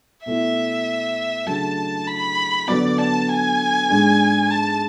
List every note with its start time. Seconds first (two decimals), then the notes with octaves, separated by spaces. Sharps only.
0.25 B2 A3 E4 E5
1.46 C#3 F#3 A3 D4 A5
2.07 B5
2.67 D3 F#3 B3 D5
2.98 A5
3.29 G#5
3.90 G#2 G#3 D4
4.50 A5